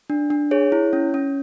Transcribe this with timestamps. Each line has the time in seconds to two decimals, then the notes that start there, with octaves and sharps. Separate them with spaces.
0.10 D4
0.30 D4
0.51 G#4 C#5
0.72 E4
0.93 C#4
1.14 C#4